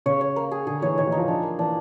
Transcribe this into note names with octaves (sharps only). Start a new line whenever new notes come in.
C#3 C#5
C#5
A#3
G#4
D3 G#4
E3 C#5
D#3 C#5
E3
D#4
F3
D4
A#3
E3 D4